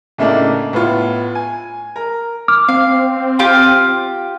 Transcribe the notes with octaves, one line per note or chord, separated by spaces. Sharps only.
A2 C#3 A3 A#3 D4 D#4
A2 B3 F4
G#5
A#4
D6 F6
C4 F5
F4 G4